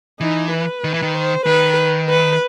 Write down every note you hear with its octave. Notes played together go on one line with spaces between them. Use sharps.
E3 D#4
B4
D#3
E3
D#3
C5
D#3 B4
B4